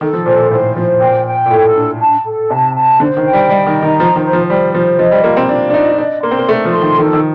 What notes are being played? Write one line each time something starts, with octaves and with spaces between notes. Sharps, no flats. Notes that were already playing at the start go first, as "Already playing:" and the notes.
D#3 A4
F3
A#2 C5
A#2
A2 C5
F3 C5
A#2 G5
G5
A#2
A2 A4
D4
A5
A4
C3 A5
A5
D3 C5
D#3
G5
G3
G3 D#5
D#3
A#5
D#3
F3 C5
D#3
C5
F3
G3 C5
F3 C5
F3 D#5
G3
A#3 F4
C4
D4 F4
D4
D#4 D#5
D4 D#5
A#3 C6
C4
A#3
A3 A4
F3
C6
D#3
D#3 A4
F3
D#3